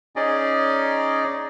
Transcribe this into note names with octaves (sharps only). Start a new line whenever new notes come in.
C#4 D#4 G#4 D5 D#5